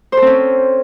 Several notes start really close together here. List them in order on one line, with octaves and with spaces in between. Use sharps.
C5 A4 C4 C#4